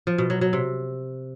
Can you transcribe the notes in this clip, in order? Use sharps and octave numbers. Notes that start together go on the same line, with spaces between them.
F3
B2
F#3
F#3
C3